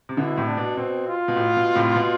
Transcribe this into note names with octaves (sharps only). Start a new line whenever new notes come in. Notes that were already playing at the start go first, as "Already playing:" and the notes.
C3
B2 D3 E4
A2 C3
D4
B2
B2 C4
F4
B2
A2
B2
A2 C3
B2